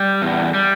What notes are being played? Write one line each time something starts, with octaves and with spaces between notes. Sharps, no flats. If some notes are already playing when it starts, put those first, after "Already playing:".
Already playing: G3
E2
G3